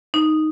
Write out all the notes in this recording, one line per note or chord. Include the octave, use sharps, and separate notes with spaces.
D#4